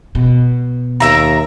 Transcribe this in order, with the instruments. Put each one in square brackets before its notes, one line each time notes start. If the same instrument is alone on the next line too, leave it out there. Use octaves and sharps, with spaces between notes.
[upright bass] B2
[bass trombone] D#2 [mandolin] A#4 E5 A#5